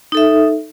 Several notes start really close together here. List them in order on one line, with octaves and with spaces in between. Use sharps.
D#4 A4 E5